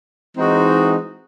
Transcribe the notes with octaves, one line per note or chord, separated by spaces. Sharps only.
E3 G#3 C4 D#4 F#4